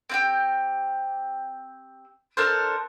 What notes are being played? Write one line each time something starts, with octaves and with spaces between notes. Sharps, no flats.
C4 F4 G4
D4 A4 A#4 C5